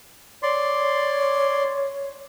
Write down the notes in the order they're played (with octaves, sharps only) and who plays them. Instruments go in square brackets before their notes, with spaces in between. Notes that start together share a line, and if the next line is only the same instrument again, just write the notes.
[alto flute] C#5 [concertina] D5 C6